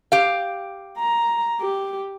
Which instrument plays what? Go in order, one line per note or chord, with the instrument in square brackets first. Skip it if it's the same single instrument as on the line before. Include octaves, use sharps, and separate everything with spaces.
[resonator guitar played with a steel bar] G4 F5
[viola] A#5
G4